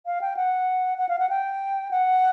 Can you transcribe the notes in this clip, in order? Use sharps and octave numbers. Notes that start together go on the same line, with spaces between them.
F5
G5
F#5
F#5
F5
F#5
G5
F#5